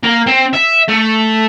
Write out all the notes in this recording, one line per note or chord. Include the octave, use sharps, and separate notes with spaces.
A#3
C4
E5
A3